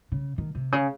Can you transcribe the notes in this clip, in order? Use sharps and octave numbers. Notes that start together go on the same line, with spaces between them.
C#3
D#3
C3
C#3